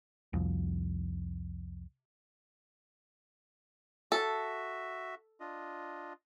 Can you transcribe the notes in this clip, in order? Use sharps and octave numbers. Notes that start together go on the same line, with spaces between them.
C2 F2
F#4 A4 E5
D4 F4 D#5